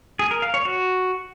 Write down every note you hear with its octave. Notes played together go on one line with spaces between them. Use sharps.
G#4
A#4
F5
C#5
F#4